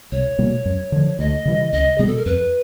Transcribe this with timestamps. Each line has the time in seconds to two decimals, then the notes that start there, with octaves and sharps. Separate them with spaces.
0.12 C2 C#5
0.39 B2 G3 A#3
0.66 F#2
0.92 D3 F3
1.19 D2 D#5
1.45 C#3 E3 G3
1.72 C#2 D#5
1.98 B2 G3 B3 G#4
2.07 A4
2.17 A#4
2.25 F2 B4